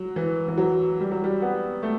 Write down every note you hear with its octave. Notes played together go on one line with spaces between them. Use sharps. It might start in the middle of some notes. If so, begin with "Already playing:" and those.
Already playing: F#3
E3
E3
F#3
G3
F#3
G3
B3
A3